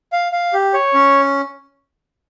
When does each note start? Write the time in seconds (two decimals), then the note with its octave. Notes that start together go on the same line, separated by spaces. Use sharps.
0.13 F5
0.32 F5
0.53 G4
0.74 C#5
0.94 C#4